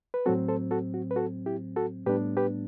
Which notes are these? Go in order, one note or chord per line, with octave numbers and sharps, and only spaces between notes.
B4
A2 F#3 C4 F#4 A4
A4 C5
F#4 A4
F#4
B4
F#4 A4
E4 G4
F#4 A4
A2 G3 B3 D4 G4 B4
G4 B4